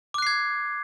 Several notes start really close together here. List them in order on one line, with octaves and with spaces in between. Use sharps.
D6 F#6 C7 G#6